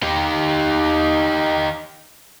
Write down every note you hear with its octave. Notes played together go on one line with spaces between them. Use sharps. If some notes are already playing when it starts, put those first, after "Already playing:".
D#4 G4